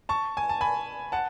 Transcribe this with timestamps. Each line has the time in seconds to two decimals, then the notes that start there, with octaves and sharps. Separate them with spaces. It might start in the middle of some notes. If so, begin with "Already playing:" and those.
0.09 A5 C#6
0.37 G#5
0.49 A5
0.61 G#5 B5
1.12 F#5 A5